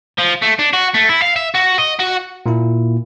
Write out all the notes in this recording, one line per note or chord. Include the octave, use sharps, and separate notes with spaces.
F3
A3
D4
F#4
A3
E4
F5
E5
F#4
D#5
F#4
A#2 A#3 E4